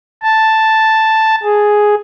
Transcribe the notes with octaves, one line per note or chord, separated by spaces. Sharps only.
A5
G#4